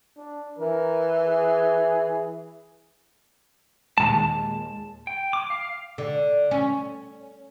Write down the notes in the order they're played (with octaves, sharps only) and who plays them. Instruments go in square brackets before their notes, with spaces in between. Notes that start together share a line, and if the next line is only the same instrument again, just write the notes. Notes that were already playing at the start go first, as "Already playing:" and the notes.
[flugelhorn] D4
[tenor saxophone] E3 [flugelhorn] A#4
[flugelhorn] G#4
[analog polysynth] D#2 A#2 G#3 [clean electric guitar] A5
[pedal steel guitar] G5
D6
F5
[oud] D3
C#4